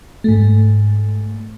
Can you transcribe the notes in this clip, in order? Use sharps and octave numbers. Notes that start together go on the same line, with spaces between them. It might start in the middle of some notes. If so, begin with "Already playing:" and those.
G#2 A3